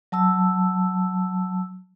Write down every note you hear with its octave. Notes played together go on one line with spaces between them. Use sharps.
F#3 A5 E6